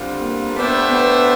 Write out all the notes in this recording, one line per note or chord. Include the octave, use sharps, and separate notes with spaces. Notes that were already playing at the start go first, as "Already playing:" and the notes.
Already playing: D3 G3 C4 F4
A#3
A3 B3 D4 G4 C5 E5
B3